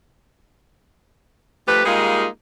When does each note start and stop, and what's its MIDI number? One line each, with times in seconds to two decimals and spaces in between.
1.68 1.84 53
1.68 1.84 57
1.68 1.84 67
1.68 1.84 71
1.85 2.27 55
1.85 2.27 56
1.85 2.27 58
1.85 2.27 63
1.85 2.27 65
1.85 2.27 68